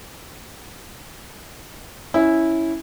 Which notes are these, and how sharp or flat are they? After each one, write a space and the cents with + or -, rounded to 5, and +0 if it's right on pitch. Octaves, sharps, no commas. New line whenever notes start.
C#4 +0 E4 -10